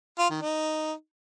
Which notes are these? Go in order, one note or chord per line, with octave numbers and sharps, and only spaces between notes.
F4
D#3
D#4